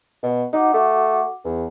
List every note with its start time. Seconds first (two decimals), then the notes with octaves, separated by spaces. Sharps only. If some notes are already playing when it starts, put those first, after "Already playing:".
0.23 B2
0.53 D#4 F#4 F#5 D6
0.74 A3
1.44 E2